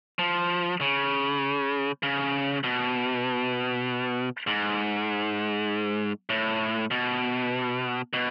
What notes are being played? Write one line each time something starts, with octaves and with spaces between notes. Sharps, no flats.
F3
C#3
C#3
B2
G#2
A2
B2
B2